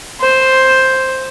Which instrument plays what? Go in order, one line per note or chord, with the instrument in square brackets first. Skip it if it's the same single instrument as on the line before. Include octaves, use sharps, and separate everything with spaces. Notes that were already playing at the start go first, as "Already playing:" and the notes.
[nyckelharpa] C5